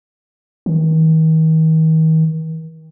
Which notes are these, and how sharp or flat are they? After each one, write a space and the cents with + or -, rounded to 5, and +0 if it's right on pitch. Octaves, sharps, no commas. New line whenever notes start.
D#3 +40